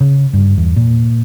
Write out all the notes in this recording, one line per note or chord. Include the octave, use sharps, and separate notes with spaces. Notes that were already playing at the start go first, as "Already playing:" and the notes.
C#3
G2
E2
A#2